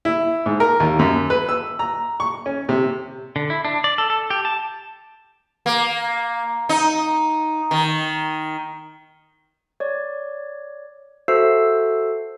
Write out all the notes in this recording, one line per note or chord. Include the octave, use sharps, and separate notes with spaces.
E4
G#2
A#4
D#2
F#2
B4
E6
A#5
C#6
C#4
C3
D3
E4
D4
D5
A4
A4
G4
A5
A#3
D#4
D#3
C#5 D5
F#4 A4 C5 E5 E6 C7